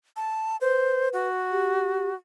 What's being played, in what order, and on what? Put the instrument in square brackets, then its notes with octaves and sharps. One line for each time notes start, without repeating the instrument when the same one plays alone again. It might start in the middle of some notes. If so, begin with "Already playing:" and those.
[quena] A5
[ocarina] B4 [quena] C5
[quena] F#4
[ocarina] G4